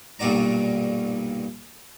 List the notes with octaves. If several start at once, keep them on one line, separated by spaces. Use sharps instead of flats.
B1 G2 A#2 F#4 D5 A#5